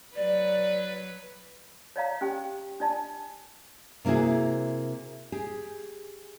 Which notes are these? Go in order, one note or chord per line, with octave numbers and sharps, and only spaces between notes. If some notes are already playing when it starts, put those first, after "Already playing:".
F#3 B4 D5
C#5 D5 F5 A#5
C#4 G4 G5
D4 D5 A5
C3 A#3 E4 F#4 G#4
G4 G#4